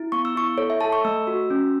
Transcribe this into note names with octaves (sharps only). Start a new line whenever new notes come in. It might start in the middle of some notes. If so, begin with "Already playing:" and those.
Already playing: E4
B3 C#6
E6
E4 C#6
A4 C#5
E5
A4 A5
C#6
A3 E6
F#4
C#4